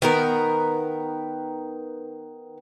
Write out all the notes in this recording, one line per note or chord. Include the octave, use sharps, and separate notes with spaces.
D#3 B3 A#4